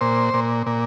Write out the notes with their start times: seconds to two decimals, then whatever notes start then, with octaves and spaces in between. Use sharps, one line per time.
0.01 A#2 C5
0.34 A#2
0.66 A#2